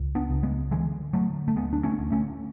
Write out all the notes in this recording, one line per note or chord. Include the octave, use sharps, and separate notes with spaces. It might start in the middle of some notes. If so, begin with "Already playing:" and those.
Already playing: C#2
B3 D4
C#2
G#3 B3
D3 E3 G#3
D3 F#3 A3
A3
D2 G#3 B3
D4
A3 C#4
D2
A3 C#4